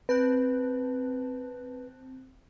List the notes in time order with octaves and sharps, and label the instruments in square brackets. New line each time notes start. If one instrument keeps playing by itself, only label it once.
[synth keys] C4 A5 F#6 [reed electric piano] B4